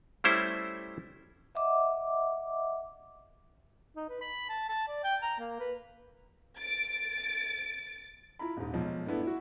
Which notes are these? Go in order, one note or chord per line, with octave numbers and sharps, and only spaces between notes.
G3 A3 C#4 E4 C5
D#5 E5 F#5 D6
D#4
B4
B5
A5
A5
D5
G5
A#5
A#3
B4
A6 D7
E4 F4 A#5 B5
D#1 G#2
B1 F3 G#3
G2 A3 B3 E4
E4 F#4